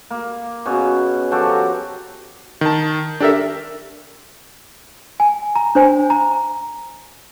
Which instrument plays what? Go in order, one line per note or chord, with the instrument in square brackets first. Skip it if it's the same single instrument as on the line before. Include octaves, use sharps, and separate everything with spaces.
[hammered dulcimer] A#3
B2 C#4 G#4
F3 F#4 G4 A4
A#5
[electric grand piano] D#3 A5
D4 G4 A4 A#4 E5
[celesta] G#5
A#5
D4 C5 G#5
A#5